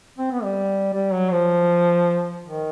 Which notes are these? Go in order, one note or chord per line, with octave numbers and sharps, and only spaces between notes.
C4
B3
G3
G3
F#3
F3
D#3